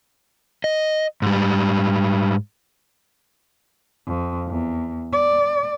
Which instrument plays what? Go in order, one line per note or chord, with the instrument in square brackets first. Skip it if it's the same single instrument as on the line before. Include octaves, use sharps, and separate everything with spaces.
[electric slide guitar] D#5
G#2 G3
[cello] F2
E2
D5